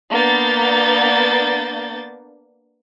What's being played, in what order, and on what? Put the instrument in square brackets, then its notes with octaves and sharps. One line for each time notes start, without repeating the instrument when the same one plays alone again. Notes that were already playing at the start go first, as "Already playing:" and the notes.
[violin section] A#3 B3 D4 G6 A6